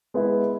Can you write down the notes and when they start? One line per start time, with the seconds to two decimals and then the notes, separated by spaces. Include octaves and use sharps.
0.14 G#3 B3 E4